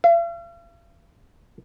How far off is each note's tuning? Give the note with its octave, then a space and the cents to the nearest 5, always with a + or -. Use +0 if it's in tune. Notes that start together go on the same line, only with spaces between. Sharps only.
F5 -45